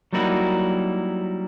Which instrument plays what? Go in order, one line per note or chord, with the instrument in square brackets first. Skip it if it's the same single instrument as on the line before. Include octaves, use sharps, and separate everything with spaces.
[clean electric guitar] F#3 G3 A#3 D#4 E4 F#4